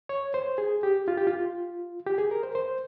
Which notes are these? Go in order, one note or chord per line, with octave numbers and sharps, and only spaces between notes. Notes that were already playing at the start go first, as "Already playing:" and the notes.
C#5
C5
G#4
G4
F4
G4
F4
G4
G#4
A#4
C5
C5